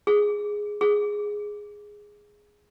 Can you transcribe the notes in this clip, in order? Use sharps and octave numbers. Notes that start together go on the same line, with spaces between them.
G#4
G#4